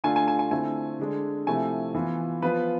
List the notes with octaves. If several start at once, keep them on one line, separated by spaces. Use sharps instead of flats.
D3 A3 D4 F4 G#5
G#5
G#5
G#5
D3 A3 C4 E4 G#5
D3 G#3 D4
C3 F3 A3 E4 G#5
E3 B3 F4
F3 B3 F4 B4